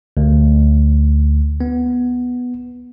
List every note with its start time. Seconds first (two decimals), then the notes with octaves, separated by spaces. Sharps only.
0.17 D2
1.61 B3